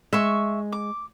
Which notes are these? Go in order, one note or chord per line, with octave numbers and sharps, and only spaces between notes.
G#3 E5 C6 C#6
D6